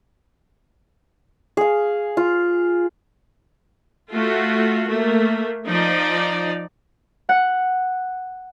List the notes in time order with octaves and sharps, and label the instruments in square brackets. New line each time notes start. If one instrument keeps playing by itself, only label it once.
[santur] G#4 F5
F4
[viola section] A3 F4 F#4
A3 A#3
F3 D#4 D5
[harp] F#5